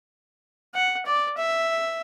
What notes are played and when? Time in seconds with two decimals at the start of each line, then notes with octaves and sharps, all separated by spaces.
0.74 F#5
1.06 D5
1.37 E5